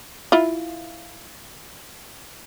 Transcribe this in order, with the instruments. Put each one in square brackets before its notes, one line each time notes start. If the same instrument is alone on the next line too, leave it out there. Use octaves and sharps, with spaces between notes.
[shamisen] E4 F4